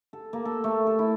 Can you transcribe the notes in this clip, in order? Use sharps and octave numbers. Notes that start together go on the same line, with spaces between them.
A4
A#3
A4
A3
A4
E4